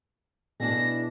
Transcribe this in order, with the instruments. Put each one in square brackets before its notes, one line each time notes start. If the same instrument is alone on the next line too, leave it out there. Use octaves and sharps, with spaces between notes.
[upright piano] B2 [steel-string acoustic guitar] D4 E4 G#4 [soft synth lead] A#6